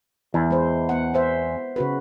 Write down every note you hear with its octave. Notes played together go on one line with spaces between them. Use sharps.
E2 E4
G#3 C5
B3 F#5
B3 C5 E5
C#3 F#4 B4